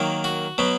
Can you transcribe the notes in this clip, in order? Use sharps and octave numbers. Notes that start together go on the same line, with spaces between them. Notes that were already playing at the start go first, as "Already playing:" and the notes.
Already playing: D#3 F#3 A#3
F#4
B2 F#3 B3